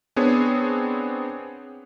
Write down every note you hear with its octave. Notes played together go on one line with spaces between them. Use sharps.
B3 C4 D4 G#4 C#5